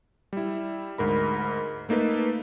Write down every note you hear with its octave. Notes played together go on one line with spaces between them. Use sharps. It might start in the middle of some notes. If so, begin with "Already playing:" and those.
G3 E4
D2 G#2 A#4 B5
A3 A#3 D#4 A4 B4